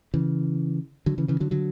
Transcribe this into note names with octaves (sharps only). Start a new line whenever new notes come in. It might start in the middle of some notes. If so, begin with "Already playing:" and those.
C#3 E3
D3 F#3
C#3 E3
C#3 E3
D3 F#3
D3 F#3